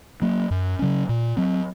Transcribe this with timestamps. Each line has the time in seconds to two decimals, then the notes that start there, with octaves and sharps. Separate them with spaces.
0.22 F#3 A#3
0.51 F#2
0.79 C#3 F#3 C#4
1.09 A#2
1.37 F#3 C4